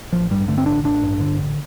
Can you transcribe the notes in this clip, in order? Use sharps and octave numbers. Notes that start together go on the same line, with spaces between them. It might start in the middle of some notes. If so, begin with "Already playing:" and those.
A1 F3
G2 G3
D3 A3
C4
A1 D4
A1 D4
G2
D3
A1